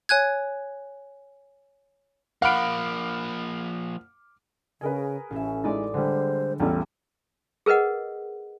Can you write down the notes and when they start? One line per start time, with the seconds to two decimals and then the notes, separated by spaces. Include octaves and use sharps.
0.09 C#5 G#5 F#6 G#6
2.42 F3 A#3 F5 F#5 B5 D6 F6 D7
4.81 C#3 G#4 A#4 B4
5.31 A1 C#4 E5
5.64 G#3 D#4 E4 D5 D#6 A6
5.94 D3 G3 G#3 C5
6.60 A1 E2 G3 C#4 F4 A4
7.66 G#4 A#4 B4 D#5 F#5